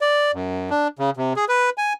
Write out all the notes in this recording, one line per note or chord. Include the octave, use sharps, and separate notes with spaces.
D5
F#2
D4
C#3
C3
G#4
B4
G#5